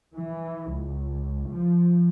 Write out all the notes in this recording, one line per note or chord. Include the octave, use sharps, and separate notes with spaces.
E3
C#2
F3